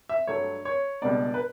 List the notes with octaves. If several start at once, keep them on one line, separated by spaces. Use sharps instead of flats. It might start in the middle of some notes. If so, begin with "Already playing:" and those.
E5
G2 F#3 A3 D4 C#5
C#5
C#2 B2 G3 B3 D4 D5
B4